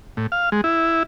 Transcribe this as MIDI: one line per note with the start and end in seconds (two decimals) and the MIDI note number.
0.17 0.27 45
0.32 0.50 77
0.52 0.61 56
0.64 1.03 64